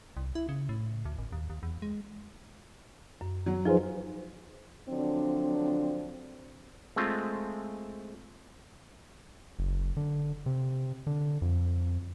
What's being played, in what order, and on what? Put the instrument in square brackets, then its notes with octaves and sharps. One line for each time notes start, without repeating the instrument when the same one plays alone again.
[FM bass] C2
E4
C#3
A2
D2
G#1
D#2
D#2
E2
G#3
[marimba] F#2
[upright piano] F#3
[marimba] F3 F4 B4 [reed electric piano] D#4 G#4 C5
[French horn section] D3 F3 F#3 C4 D4
[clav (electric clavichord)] G#3 A3 C4 F4
[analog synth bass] F#1
D3
C3
D3
F2